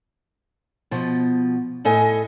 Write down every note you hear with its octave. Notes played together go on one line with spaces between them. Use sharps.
B2 F3
A2 A4 D#5 G#5